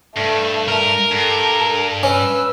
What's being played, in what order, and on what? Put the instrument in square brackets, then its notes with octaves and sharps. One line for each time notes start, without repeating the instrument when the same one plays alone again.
[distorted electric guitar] G2 [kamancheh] A3
[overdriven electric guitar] A#4
[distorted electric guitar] G2 [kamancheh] A4
[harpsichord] C#4 [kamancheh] B4 E6